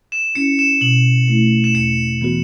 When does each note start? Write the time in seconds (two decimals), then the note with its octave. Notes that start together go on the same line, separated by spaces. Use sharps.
0.12 E7
0.35 C#4 E4 C#7
0.59 E7
0.81 B2 F#7
1.28 A3 E4
1.64 E7
1.74 E2 C#7
2.21 E3 B3 F#4